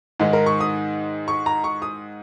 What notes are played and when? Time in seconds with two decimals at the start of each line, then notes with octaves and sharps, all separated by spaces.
0.20 G#2 D#3 G#3
0.33 A#4
0.46 C#6
0.61 D#6
1.28 C#6
1.46 A#5
1.64 C#6
1.82 D#6